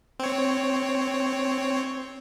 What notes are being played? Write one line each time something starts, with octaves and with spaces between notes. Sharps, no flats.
C4 C#5